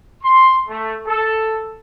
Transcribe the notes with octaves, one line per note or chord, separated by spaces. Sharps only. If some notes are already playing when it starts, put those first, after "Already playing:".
C6
A3
A4